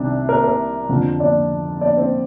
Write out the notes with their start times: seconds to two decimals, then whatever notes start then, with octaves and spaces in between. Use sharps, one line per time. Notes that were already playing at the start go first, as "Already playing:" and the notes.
Already playing: C2 C3 D#3 D4
0.29 A#4
0.44 A#4
0.89 F2 D3 F3
1.20 D4 D5
1.81 D4 D5
1.97 C4 C5